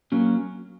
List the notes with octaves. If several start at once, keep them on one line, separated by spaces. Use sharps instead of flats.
F#3 A#3 C#4